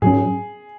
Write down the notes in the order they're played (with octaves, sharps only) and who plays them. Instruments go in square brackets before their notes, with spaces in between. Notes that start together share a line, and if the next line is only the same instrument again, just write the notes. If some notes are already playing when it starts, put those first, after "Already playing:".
[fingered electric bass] G#2 F#3 C#4 [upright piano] G#4